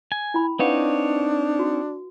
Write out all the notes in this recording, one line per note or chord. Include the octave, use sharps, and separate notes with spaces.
G#5
E4 G5 B5
C4 D4 D#4 B4 C#5 F5 F#5
F#4